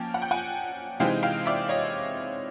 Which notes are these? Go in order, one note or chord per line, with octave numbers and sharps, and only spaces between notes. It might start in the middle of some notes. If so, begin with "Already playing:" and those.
Already playing: F3 A#3 C#4 G5 A5
F#5
G5
F#5 G#5
C3 E3 G#3 C4 D#4 F5 G5
F5 G5
D5 E5
C#5 D#5